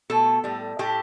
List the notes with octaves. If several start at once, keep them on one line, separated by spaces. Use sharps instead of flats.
B2 A3 A4
A2 G3
A2 A3 G4